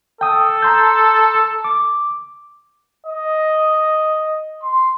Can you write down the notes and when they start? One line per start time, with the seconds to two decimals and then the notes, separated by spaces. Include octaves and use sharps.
0.21 A4 G5 D#6
0.62 A#5 C6 G6
1.64 D6
3.07 D#5
4.63 C6